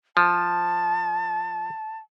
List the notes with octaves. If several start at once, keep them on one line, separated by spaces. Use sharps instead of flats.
F3 A5